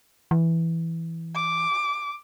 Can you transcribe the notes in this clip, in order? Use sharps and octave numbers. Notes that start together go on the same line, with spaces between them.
E3
D6